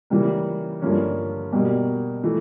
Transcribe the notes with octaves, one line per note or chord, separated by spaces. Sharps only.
C#3 E3 G3 A#3
G2 D3 F3 A#3 C#4
B2 G3 A#3
E3 A3